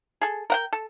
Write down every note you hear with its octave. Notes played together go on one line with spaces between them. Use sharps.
G#4 A4
A#4 F#5 G5
A4